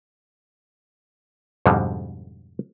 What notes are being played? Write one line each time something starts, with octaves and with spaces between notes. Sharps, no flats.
F2 G#2 B2 D3 G3 G#3